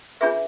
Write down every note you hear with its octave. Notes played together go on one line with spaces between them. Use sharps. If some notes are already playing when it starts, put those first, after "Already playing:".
D4 F4 G#4 B4 E5